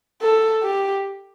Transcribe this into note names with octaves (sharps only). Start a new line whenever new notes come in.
A4
G4